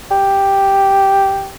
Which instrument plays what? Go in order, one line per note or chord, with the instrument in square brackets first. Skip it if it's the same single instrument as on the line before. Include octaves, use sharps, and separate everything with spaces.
[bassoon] G4